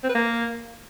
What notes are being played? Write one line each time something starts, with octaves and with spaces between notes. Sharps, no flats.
C4
B4
A#3